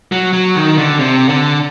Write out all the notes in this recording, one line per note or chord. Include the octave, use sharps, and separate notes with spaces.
F#3
F#3
D#3
D3
C3
D3